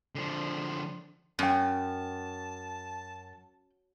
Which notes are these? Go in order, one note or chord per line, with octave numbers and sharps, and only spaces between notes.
D3 F3
F#2 C#4 G5 A5